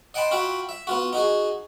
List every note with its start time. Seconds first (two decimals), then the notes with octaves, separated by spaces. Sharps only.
0.14 D#5 F#5 G5 A5 B5 C6
0.31 F4 F#4 E5 G5 B5
0.69 E5
0.87 B3 F4 F#4
1.13 D#4 F#4 G#4